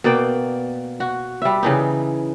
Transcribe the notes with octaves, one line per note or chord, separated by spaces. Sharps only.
B2 A#3 D5 G5
F#4
G3 E5
C#3 E3 D#4